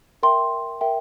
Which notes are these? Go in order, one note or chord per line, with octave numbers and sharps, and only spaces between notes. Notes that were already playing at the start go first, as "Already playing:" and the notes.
A#4 E5 G5 C6
A#4 E5 G5